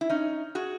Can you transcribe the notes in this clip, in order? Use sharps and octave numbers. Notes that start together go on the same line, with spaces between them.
E4
C#4 D#4
F#4 G#4